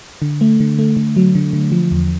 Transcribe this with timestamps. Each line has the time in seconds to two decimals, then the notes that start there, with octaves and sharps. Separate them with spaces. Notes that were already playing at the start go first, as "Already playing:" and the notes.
0.22 D3
0.41 A3
0.60 D3
0.79 A3
0.97 D3
1.16 F#3
1.35 D3
1.53 D3
1.72 F3
1.91 E2